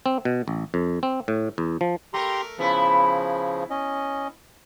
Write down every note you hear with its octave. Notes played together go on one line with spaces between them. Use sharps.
C4
B2
A1
F2
C4
A2
E2
F3
A3 G4 A#4 A#5 C6
C#3 F3 B3 E4
C#4 D#5